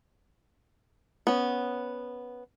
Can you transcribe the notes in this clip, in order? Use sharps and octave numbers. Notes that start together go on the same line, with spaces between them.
B3 C#4